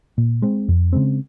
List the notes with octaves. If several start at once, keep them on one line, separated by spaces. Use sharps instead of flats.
A#2
G#3 C4
F2
C#3 G#3 C4